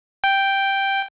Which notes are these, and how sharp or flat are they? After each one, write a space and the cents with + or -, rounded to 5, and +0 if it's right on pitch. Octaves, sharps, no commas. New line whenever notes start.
G5 +0